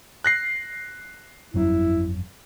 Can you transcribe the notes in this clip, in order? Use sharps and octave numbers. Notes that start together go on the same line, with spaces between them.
F#6 A#6 C7
G1 F2 F#3 E4